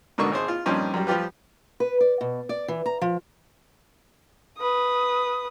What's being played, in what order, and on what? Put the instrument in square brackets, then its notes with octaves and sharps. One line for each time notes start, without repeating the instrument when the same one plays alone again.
[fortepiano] G#2 B2 D3 A#3 C#6
G#1 G#4 C5
F4
G2 A#2 F3 C4 C#4 D#4
F#2 G3
F3 G3 F4 G4 B4
[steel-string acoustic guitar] B4
D5
B2
D5
E3
A#5
F3
[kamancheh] B4 D#6